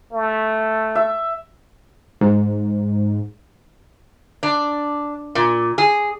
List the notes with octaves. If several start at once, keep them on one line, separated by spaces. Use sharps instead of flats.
A3
E5
G#2
D4
A#2
G#4